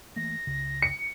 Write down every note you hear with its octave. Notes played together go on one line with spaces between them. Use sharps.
E3 A3 A#3 A#6
C#2 C#3
C#7